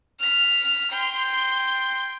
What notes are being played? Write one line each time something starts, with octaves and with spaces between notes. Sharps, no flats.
F6 B6
G5 C6